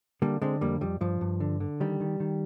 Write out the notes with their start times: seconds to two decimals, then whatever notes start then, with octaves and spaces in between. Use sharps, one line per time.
0.22 D3 G3 A#3
0.42 D3 G#3 C4
0.61 F2 G3 A#3
0.81 F2 G3
1.01 G2 F3
1.21 G2
1.40 D3
1.60 D3
1.80 D#3 G3
2.00 D#3
2.20 D#3